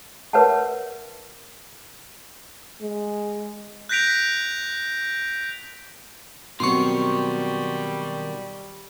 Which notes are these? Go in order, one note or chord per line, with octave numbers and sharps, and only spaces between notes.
A#4 B4 C#5 E5 F#5 A5
G#3
F#6 G6 A#6 B6 D7 F7
B2 D#3 F#3 G3 C4 C6 C#6